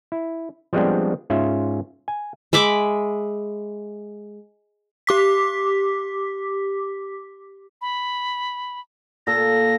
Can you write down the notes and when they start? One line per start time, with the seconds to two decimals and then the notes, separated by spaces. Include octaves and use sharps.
0.12 E4
0.73 F3 G3 G#3 B3 C4 D4
1.30 G#2 C#4 F4 E5
2.08 G#5
2.53 G#3 E5 B5 D6
5.07 G4 D6 B6
7.81 B5
9.27 A#2 A4 A#6